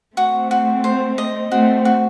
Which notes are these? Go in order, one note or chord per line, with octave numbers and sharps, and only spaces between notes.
A3 C4 F#4
F#4
C5
D#5
A3 C4 F#4
F#4